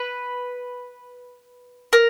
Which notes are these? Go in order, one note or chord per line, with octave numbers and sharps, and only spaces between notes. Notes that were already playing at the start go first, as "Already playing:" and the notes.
Already playing: B4
A#4